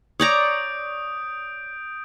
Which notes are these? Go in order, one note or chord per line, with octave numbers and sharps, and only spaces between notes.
C#5 D5 A#5 D#6 G6 D7